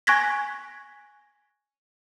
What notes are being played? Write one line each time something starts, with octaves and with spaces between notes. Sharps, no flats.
G#5 C#6 F#6 G#6 A#6 B6